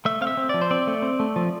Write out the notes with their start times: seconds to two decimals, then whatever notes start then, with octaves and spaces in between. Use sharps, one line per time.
0.05 A3 E5
0.21 C4 F5
0.27 E5
0.37 C4
0.49 F3 D5
0.61 C5
0.71 C4 D5
0.87 A3
1.02 C4
1.20 A3
1.36 F3